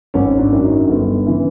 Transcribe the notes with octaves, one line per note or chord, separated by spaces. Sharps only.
G#1 C#4
D4
F#2 D#3
D#4
G1
C#3 E3